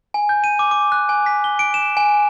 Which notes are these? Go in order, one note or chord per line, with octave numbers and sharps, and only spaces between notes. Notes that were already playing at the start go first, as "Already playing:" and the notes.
G#5
G6
D#7
D6
D6
F#6
G#5
B6
G7
D7
E7
G#5